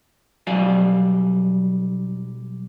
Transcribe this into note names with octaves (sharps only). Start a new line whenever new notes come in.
B1 F#3 G3 D5 F5 G#5